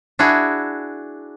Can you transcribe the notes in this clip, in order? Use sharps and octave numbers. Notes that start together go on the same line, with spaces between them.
D4 E4 F#4 G#4